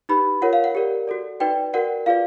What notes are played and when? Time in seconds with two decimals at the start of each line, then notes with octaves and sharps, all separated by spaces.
0.09 D#4 G4 B4 B5
0.42 F4 A#4 C#5 F#5
0.53 F5
0.64 F#5
0.75 G4 A#4 D5
1.07 F#4 A4 D5
1.40 D#4 F#4 B4 D5 G5
1.73 F#4 A#4 D5 F#5
2.06 F4 G#4 B4 D5 F5